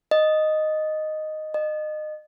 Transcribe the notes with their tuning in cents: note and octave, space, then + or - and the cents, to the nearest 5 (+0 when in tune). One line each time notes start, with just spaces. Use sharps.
D#5 -5
D#5 -25